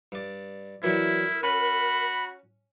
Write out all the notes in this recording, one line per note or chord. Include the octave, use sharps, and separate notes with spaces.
G2 D5
E3 F#3 D4 E4 A#4
C#4 F#4 B5